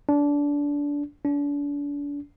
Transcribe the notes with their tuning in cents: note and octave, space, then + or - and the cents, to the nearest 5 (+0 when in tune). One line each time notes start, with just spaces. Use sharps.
D4 -25
D4 -40